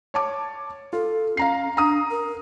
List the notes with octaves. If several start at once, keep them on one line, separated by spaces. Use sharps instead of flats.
C#5 A5 D6
F4 A4
C#4 F5 A#5 C7
D4 A#5 D#6
A#4